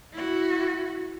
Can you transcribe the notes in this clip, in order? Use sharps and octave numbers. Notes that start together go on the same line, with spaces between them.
E4 F#4